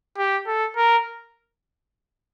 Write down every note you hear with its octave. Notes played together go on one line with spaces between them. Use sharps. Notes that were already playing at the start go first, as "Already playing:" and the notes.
G4
A4
A#4